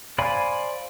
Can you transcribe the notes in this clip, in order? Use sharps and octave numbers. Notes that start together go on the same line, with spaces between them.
C5 D5 F5 G#5 B5